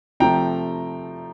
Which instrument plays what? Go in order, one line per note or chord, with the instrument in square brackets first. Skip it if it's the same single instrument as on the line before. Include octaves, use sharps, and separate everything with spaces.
[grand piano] C3 F3 A3 G5 A#5